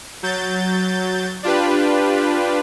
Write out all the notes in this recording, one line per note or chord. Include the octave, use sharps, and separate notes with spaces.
F#3 G6 A6
D4 F4 G4 B4